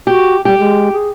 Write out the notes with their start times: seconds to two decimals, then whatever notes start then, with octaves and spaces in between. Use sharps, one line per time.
0.07 F#4 G4
0.45 G3 G4
0.58 G#3
0.92 G#4